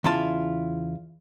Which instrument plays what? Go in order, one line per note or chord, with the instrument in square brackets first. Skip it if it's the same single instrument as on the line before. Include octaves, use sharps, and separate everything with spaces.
[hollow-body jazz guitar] E2 C#3 E4 F4 A5